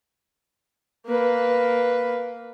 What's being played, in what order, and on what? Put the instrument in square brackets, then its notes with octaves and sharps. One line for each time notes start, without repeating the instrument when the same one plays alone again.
[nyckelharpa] A#3 B4